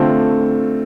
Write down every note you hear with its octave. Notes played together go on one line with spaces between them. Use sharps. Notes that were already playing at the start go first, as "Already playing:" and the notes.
Already playing: D3 A3 C4 F4